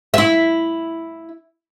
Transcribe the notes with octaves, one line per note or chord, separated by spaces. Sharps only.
E4 E5